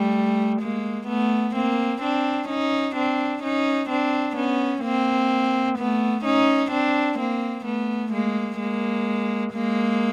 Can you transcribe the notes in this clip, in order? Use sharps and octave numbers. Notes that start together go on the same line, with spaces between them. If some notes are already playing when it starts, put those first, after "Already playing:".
Already playing: G3 A3
G#3 A#3
A3 B3
A#3 C4
C4 D4
C#4 D#4
C4 D4
C#4 D#4
C4 D4
B3 C#4
A#3 C4
A3 B3
C#4 D#4
C4 D4
A#3 C4
A3 B3
G#3 A#3
G#3 A#3
G#3 A#3